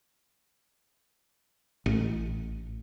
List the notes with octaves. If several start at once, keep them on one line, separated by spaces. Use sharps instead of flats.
A1